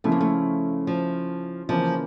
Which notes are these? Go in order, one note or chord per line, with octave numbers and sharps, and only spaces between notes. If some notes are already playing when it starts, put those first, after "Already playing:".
C#3 F3 A3 C#4 E4
A#3
A3
F3
C#3 E3 F3 A#3